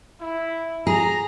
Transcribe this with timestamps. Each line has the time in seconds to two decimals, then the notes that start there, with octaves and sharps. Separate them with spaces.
0.21 E4
0.87 G#4 A#5